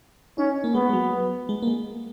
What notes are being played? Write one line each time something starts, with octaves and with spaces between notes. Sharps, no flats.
C#4 D#4
A#3
G#3 B3
G#3
F#3
G#3
A#3
G#3